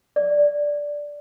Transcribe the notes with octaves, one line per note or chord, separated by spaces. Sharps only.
D5